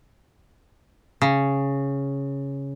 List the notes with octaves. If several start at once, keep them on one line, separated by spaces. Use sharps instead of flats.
C#3